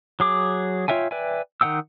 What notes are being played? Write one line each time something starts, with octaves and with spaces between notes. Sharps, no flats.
F#3 G#4 D6
F4 C#5 E5 G5 G#5
B4 D5 E5 G5 G#5
D#3 D#4 F#5 G5 E6